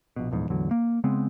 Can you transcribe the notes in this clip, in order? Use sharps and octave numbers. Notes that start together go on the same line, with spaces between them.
A#1 B2
D#1 A#1 E2 G#2
A1 E2 D3 F#3
A#3
C#3 G#3 B3 C4